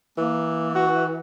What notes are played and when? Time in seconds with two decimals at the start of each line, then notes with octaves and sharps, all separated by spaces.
0.18 E3 A#3
0.75 F#4